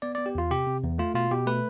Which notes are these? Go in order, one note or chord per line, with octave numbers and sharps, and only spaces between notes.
B3 D5
B3 D5
G4
E2 F4
C3 G4
C3
E2
A3 F4
B2 F4
B2 G4
A3 B4